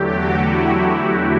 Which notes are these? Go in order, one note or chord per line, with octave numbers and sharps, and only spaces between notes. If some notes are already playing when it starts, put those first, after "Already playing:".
Already playing: E2 D3 F#3 A3 G4
F#4
E4